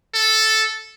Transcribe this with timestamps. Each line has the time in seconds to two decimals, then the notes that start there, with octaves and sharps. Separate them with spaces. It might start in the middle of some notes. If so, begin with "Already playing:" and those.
0.15 A4